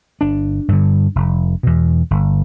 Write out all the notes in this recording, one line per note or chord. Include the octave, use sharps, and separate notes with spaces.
G1 D4
G2 D3
F1
E2 B2
G1